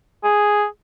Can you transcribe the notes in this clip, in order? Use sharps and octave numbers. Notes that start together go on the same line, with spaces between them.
G#4